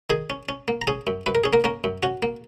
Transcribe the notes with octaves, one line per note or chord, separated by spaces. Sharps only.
D#3 G#4 G#5
C#4
C#4
A#3
A#5
C#4 G#4 G#5
F#2
F#2 B4
A#4
C#4 G#4
A#3 A#4
A#3 C#4 A#4
F#2
C#4 F#4
A#3